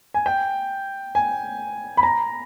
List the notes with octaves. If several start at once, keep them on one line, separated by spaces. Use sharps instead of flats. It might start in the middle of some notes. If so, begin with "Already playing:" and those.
G#5
G5
G#5
B5
A#5